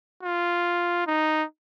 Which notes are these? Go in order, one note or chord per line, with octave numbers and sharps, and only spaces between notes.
F4
D#4